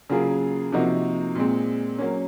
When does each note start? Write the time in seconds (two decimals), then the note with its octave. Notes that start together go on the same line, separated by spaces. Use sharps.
0.10 C#3 F#3 A#3 F4 G#4
0.72 C3 F3 A#3 D#4 F#4
1.35 A#2 G#3 C4
1.98 F#3 A#3 C#4